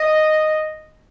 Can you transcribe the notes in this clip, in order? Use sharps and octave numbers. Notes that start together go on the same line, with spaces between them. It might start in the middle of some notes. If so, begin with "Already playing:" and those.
Already playing: D#5